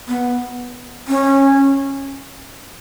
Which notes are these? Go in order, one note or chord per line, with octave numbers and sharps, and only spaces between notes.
B3
C#4